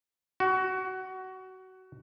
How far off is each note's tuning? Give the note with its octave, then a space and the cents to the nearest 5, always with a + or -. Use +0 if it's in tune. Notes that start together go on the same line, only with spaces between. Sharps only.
F#4 +20